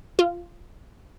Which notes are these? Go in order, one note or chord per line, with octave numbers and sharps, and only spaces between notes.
F4